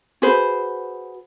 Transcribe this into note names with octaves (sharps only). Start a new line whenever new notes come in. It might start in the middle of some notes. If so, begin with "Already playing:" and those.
F#4 G#4 B4 C5